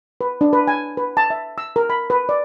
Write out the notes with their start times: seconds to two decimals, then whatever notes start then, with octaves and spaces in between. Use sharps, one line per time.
0.21 B4
0.41 D4
0.53 B4
0.67 G#5
0.97 B4
1.17 A5
1.30 E5
1.58 E6
1.76 A#4
1.90 B5
2.10 B4
2.29 D5